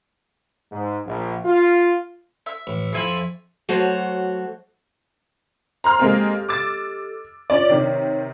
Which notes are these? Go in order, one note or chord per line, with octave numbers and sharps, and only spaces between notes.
G#2
A#1
F4
E5
A1
F2 C4 E4 F4 G#5 B5
F#3 A3 F#4 A4 C5 C#5
C5 A#5 C6 F6
G#3 A#3 C4 G4 A4 D#5
D6 E6 A6
C#4 D4 F4 C#5 D5
C3 D#3 C#5